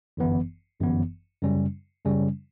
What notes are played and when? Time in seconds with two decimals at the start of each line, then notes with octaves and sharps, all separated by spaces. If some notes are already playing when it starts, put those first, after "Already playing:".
0.17 G1 F#2 E3 B3
0.80 G1 F#2 E3 B3
1.42 F#2 C#3 G3 C#4
2.05 F#2 C#3 G3 C#4